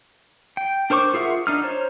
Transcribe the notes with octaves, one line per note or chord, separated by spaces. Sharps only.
G5
D4 A#4 C5 C#6 D6
F4 G#4 A#4 E5 F#5
D4 D#4 F6
C5 C#5 A#5